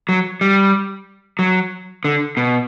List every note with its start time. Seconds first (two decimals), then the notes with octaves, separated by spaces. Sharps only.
0.09 F#3
0.41 G3
1.39 F#3
2.04 D3
2.37 B2